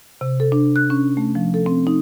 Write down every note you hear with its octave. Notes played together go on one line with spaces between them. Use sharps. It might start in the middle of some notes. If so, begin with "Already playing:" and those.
C3
A4
D4
F#6
C#4
A3
F3
A4
C4
D#4